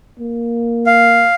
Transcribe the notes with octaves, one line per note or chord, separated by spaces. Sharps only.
A#3
F5